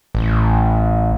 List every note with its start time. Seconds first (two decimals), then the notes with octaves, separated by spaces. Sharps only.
0.15 A1